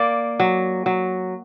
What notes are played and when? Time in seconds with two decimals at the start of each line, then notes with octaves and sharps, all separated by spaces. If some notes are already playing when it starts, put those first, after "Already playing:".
Already playing: A#3 D5
0.40 F#3
0.86 F#3